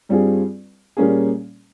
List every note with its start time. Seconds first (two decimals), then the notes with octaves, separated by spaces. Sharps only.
0.09 G2 G3 C4 F4 G#4
0.97 A#2 G3 A#3 C#4 G#4